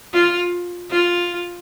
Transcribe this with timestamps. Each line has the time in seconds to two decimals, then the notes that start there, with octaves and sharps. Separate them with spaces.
0.14 F4
0.90 F4